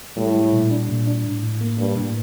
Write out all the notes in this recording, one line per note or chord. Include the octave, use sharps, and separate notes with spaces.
A2 G3
G3
A#2
D4
A#2
D4
A2
A2
A#3
G2 A#3
A2